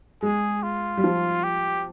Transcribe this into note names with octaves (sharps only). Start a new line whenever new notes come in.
G#3 G#4
F4
G3
F3
G4